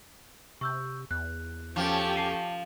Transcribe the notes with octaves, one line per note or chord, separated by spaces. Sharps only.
C3 C#6 E6 G6
E2 F#6
F3 C#4 G4 A4 A5
A5 C7 D#7